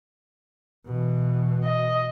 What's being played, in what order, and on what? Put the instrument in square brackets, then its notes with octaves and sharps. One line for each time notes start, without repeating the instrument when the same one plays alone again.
[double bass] B2 E3
[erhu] D#5